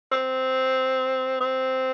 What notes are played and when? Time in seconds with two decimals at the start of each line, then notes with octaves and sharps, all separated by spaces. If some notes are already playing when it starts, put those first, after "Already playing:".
0.12 C4
1.40 C4